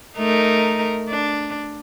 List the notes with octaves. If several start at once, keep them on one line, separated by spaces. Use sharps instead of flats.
A3 D#4 A#4
D4